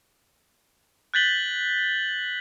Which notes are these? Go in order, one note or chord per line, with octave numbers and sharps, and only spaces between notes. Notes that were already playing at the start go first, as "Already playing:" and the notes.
F#6 G6 A6 B6 F#7 G7